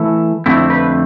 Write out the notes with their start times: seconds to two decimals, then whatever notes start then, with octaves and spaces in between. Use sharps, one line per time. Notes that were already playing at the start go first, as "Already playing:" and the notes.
Already playing: E3 A3 E4
0.46 F2 D3 A3 C4 E4
0.70 B4